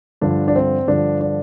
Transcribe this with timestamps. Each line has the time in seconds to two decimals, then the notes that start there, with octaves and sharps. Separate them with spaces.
0.21 G2 D3 F3 D4
0.48 D4
0.55 C4
0.87 G2 D3 F3 D4
1.21 D4